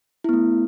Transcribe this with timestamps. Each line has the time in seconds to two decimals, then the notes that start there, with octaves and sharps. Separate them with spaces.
0.24 E4
0.29 B3
0.33 A3